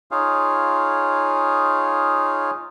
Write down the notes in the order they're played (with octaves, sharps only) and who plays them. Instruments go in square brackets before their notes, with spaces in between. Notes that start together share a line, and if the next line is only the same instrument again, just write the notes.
[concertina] D#4 F4 G#4 C#5 F5